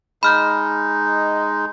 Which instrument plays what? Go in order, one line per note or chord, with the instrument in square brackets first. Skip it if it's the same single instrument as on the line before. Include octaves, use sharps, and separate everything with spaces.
[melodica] G#3 D#4 [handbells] B5 F6 G6